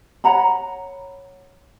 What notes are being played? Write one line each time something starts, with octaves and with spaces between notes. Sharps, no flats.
C#5 F#5 A#5 B5